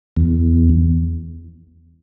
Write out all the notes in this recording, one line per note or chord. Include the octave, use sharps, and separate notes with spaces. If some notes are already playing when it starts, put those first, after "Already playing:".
E2